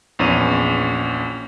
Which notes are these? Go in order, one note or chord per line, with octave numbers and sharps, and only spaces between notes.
A#1 E2 C#4 D#7